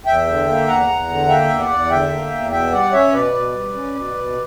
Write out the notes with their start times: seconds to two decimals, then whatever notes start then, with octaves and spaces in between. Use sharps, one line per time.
0.06 E2 E5 G5
0.27 D3
0.47 A#3
0.68 E2 F#5 A#5
0.88 E2
1.08 D3
1.29 A#3 E5 G5
1.49 E2
1.59 D5 F#5
1.70 E2
1.90 D3 E5 G5
2.10 A#3
2.31 E2
2.51 B2 E5 G5
2.71 G3 D5 F#5
2.92 C#4 C#5 E5
3.12 B2 B4 D5
3.33 B2
3.53 G3
3.74 C#4
3.94 B2
4.15 B2